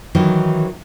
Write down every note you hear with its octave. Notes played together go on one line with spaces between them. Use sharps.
D#3 E3 F#3 D#4